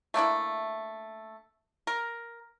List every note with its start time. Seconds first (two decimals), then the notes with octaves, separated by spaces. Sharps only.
0.14 A3 A#3 D4 E4
1.87 A#4